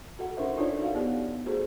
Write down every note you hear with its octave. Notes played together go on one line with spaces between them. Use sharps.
F#4 A4 F#5
C#4 D#4 A#4 C5 E5
D4 D#4 F4 A4 C#5 D5
F#4 F5 F#5
B3 G4 D5
A3 F#4 G#4 A4 C5